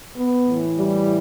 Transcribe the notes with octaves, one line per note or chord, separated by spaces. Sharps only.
B3
A2 E3
G3